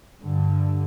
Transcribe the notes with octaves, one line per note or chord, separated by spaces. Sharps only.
G2 D3